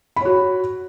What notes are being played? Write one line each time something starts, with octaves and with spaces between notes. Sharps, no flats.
F#4 C#5 B5